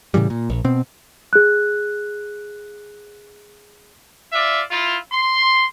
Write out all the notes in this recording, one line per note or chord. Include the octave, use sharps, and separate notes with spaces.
A2 C#3 E3 G3
A#2
A#1
B2 C4
G#4 F#6
F4 D5 E5
E4 F4
C6